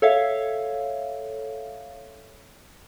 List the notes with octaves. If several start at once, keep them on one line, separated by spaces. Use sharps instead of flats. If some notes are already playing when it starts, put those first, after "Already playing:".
A4 C#5 E5 F5